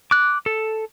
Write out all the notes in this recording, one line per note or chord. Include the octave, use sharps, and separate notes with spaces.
D6 F#6
A4